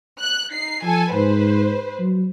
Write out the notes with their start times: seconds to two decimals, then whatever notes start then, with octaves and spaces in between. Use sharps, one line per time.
0.19 F#6
0.52 D#4 C7
0.84 F3 A4 G#5
1.13 G#2 B4 C5
2.00 F#3